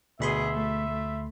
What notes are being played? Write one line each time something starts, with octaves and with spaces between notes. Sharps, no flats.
D2 B2 G#4 E5 B5 C6
A3
A3